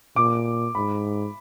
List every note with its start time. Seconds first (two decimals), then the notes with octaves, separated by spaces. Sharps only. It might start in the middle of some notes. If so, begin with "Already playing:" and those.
0.16 A#2 D6
0.75 G#2 B5